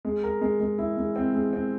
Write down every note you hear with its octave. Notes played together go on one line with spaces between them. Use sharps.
G#3
A#4
G#3
G#3
E4
G#3
C4
G#3
C4